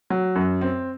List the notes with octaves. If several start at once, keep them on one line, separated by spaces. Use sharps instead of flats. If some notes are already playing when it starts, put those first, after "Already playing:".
F#3
F#2
C4